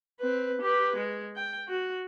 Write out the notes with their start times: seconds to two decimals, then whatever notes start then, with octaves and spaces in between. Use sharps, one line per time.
0.20 C4 B4
0.61 G4 B4
0.96 G#3
1.36 G5
1.68 F#4